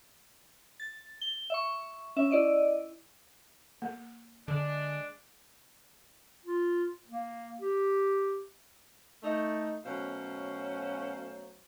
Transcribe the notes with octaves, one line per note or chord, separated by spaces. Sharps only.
A6
G7
E5 C#6
C#4 E5
E4 D5 D#5
A#3
D3 G#3 D4
F4
A#3
G4
A3 D#4
B2 F#3 A3 C#4 C5 F5